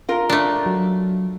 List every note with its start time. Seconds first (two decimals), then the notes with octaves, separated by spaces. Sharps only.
0.09 F4 A#4
0.30 A3 D4
0.66 F#3